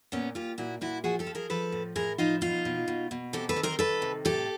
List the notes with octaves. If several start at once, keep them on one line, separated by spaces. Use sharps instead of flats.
A#2 B3 C#4
A#2 F4 G4
A#2 E4 F#4
A#2 E4 F#4
F3 F#4 G#4
G4 A4
F3
G#4 A#4
F3 A4 B4
A2
A2 G#4 A#4
F3 D#4 F4
B2 D#4 F4
B2
B2
B2
C3 G4 A4
A4 B4
D#3
A#4 C5
D#3 A4 B4
C3
A2 G4 A4